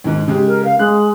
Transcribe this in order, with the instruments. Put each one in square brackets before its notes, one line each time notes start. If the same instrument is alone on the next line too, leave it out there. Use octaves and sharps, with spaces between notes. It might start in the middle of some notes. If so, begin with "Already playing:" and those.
[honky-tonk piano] D#2 G#2
C#3 G#3 G4
[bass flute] A#4
F5
[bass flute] G#3 [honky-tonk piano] F#6